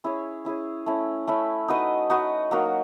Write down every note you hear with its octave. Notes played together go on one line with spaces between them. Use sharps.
C#4 E4 G#4 C#5
C#4 E4 G#4 C#5
A3 C#4 E4
A3 C#4 E4
D#4 F#4 B4 D#5
D#4 F#4 B4 D#5
F#3 A#3 D#4 F#4